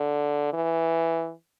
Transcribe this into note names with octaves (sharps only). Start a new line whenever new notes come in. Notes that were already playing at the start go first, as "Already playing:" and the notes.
Already playing: D3
E3